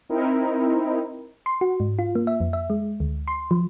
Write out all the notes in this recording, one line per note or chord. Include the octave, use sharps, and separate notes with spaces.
C4 D#4 E4 A#4
C6
F#4
G#2
F4
A#3
E5
F2
E5
G#3
D2
C6
F3